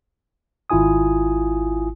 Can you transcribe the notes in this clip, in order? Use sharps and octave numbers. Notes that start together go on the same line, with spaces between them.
G#1 E4 F4 G#5 D#6